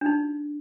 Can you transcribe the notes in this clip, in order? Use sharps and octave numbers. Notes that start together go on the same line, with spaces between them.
D4
D#4